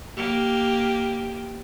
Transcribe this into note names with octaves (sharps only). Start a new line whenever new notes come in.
A#3 G4